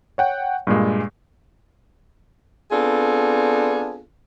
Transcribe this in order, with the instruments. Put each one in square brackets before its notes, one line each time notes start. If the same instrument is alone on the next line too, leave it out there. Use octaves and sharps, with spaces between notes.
[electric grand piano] C#5 F#5 G5
G2 A#2 G#3
[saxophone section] B3 C4 D4 F4 G#4 A4